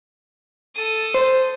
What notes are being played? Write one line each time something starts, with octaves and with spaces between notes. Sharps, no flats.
A4 D#6
C5